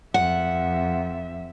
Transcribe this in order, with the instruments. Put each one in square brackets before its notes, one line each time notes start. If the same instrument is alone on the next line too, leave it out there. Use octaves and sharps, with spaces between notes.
[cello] F2 E5 [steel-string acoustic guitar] F#5